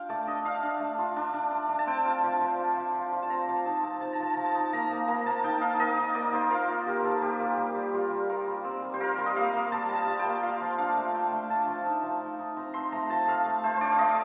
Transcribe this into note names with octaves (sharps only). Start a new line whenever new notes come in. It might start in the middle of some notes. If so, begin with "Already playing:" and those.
Already playing: D4 F4 F5 G5
A3 D5
D4 D#5
D4 F5
D4
A3
F4
D4
D4
D4
D4
A5
C4 G5
F4
F3
F3
F4
F3
F4
F4
A5
C4 A#5
F3 A5
D#4 A5
C4 A5
D#4 A5
A#5
F3 A5
F3 A#5
A5
D#4
A#3 A#5
A#3
A#3 A#5
A#3 A5
D#4 G5
D#4 F5
A#3 D#5
D#4
A#3 D5
A#3 C5
F4 A#4
F4
A#3 G4
A#4
A#3 A4
A#3 G4
F4 A#4
G3 G4
G3
G3 F4
G3
F4 A#4
G3
C4
G3
C5
F4 A#4
G3
D#5
A#3 F5
A#3
G3 A5
G3
A5
F4
G5
A#3
F4 F5
F3
D4 F5
A3
A3 G5
A3
D4 A5
F3
D#4
F3
D#4
D#4
C4 A#5
C4 C6
A3 A#5
F3 A5
A3 F5
A3
A3 C5
C5
D4 D5
F5
A3 D#5